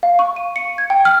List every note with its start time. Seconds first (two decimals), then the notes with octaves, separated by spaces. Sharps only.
0.03 F5
0.19 C#6
0.36 D#7
0.56 C#7
0.78 G#6
0.90 G5
1.05 F6